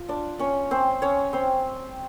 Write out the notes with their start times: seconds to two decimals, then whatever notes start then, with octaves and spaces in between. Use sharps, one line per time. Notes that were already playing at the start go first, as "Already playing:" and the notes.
Already playing: F4
0.09 D4 D5
0.39 C#4 C#5
0.71 C4 C5
1.02 C#4 C#5
1.33 C4 C5